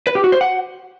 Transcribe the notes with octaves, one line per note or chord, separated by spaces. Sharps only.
B4
G4
F#4
C5
F#5